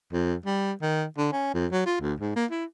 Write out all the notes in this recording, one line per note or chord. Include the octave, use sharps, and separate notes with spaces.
F2
G3
D#3
D3
C#4
F2
F#3
F4
D2
G#2
A#3
E4